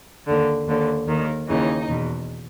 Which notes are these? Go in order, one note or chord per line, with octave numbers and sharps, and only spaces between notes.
D#2 D3
D#2 D3
D#2 D#3
D#2 C#3 E3 D#4
E2 B2